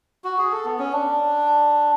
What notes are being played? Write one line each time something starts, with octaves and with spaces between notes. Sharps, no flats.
F#4
G#4
A4
B3
C#4
D4